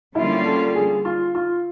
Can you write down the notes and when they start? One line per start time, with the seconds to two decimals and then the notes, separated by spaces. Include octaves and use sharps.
0.15 D3 G3 A#3 C#4 E4 F4
0.45 A4
0.75 G#4
1.05 F4
1.35 F4